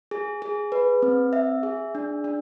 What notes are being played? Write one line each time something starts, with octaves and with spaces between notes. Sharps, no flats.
G#4
G#4
B4
C4
E5
G#4
D4
D4